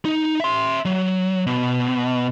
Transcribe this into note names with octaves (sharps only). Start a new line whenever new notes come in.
D#4
E5 C6
F#3
B2